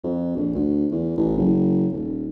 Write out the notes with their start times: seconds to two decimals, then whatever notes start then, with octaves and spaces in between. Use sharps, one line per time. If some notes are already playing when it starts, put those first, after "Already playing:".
0.04 F2
0.36 A#1
0.55 D2
0.91 E2
1.17 A1
1.37 F#1
1.92 D#1